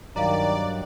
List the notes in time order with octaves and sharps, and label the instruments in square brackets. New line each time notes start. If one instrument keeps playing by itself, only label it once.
[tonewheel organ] G2 F#3 [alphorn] D#3 [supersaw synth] D5 [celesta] F5 A#5